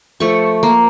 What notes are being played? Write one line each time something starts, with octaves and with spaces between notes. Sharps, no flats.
F3 A3 C#6
A#3